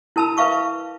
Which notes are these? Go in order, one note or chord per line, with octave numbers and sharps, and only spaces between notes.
E4 A#4 A5 B5 E6
A#4 B4 E5 F5 C#6 D6